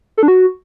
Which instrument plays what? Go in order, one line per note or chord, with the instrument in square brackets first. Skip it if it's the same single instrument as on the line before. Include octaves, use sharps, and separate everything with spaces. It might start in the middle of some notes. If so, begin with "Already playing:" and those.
[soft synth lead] A4
D4
F#4